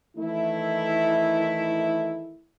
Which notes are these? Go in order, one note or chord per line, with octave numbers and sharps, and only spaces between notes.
D#3 E3 A3 E4